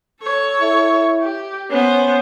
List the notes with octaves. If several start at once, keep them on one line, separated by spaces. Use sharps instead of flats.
A4 C#5
E4
G4
B3 C#4 C5